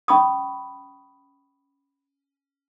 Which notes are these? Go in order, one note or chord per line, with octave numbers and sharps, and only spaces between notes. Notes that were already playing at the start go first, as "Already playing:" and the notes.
C#4 B5 C#6 D#6